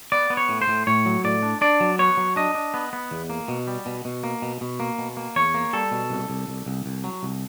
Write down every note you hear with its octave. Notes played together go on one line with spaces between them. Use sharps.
B3 D5
B3
C#5
A2
C5
A2
A2 C#5
F#3
A2 D5
D4
D4 D5
F#3
B3 C#5
F#3
D4 D#5
D4
B3
B3
E2
A#3
B2
G3
B2
B2
A#3
B2
B2
A#3
B2
A#3
E2 C#5
A#3
G3 A4
B2
C2
C2
C2
C2
C2
F#3
C2